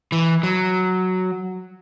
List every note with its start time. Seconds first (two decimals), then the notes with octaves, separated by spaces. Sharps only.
0.12 E3
0.43 F#3